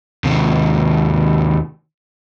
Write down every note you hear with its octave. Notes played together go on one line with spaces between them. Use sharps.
D#2 C3